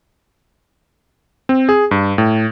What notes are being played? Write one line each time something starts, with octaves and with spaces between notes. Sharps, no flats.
C4
G#4
G2
A2